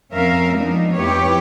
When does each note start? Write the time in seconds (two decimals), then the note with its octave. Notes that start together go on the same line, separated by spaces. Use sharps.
0.11 F2 C4 C#4 A#4 E5 F5
0.56 F3 G#3 A#3 B3 D4 D#4
0.94 F2 B3 E4 G4 B4 C#5